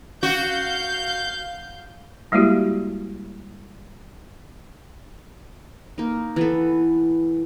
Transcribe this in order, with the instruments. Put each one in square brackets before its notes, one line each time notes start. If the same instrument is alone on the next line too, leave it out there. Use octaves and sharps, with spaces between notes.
[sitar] F#4 [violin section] F5 G6
[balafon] G3 G#3 A#3 E4 F#4 G4
[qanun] A#3 D#4
E3 B3 A4